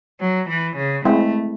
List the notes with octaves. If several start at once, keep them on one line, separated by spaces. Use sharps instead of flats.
F#3
E3
C#3
G#3 A3 C4 E4